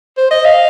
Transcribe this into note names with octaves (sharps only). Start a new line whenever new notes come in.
C5
D#5
F5